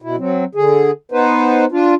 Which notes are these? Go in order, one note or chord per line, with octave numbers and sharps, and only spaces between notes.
B2 E4
F#3 C4
D3 G#4
B3 D#4 B4 C5
D4 F4